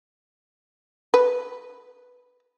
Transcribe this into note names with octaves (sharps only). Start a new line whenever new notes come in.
B4